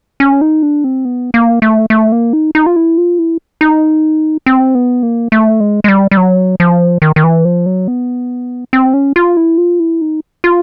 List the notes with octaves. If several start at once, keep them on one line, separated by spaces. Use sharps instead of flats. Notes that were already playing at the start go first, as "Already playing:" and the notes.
C#4
D#4
D4
C4
B3
A#3
A3
A3
A#3
D#4
D#4
F4
E4
F4
E4
D#4
C4
B3
A#3
A3
G#3
G#3
G3
G3
F#3
F3
D#3
D#3
E3
F3
F#3
B3
C4
C#4
F4
E4
F4
E4
D#4
F4